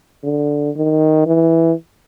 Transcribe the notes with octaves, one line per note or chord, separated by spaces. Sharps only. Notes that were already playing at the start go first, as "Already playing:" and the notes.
D3
D#3
E3